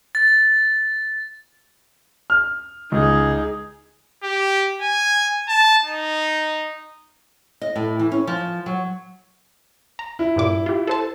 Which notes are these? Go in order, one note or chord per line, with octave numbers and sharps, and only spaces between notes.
A6
F6
C#2 D#4 G#4
G4
G#5
A5
D#4
D#5
A2
E3
C#4
F3
F#3
A#5
E4
G2 A#2 D6
F4 G4
A4 C5 A5